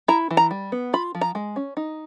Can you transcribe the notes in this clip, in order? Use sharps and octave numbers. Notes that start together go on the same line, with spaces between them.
E4 A#5
E3
A#5
G3
B3
F4 B5
F3
A#5
G#3
C#4
D#4